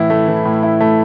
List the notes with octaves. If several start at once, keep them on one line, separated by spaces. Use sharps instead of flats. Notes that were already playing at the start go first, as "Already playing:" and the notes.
Already playing: A2 E3 E4
A3
E3
A2
E4
A3